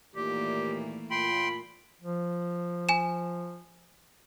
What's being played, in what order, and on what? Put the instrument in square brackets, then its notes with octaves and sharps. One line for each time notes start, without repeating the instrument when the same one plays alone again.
[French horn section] D#2 A#2 D5 [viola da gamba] E3 A3 A#3 [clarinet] G4
[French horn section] A#2 F4 [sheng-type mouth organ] G5 C6 [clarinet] B5
[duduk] F3
[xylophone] G#5 E7